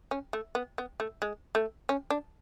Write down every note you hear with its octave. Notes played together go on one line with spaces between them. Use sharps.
C#4
A3
B3
B3
A3
G#3
A3
C#4
D4